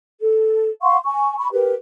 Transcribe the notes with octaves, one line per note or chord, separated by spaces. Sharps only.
A4
F5 F#5 C6 C#6
G#5 C#6
B5 C#6
G4 A#4 B4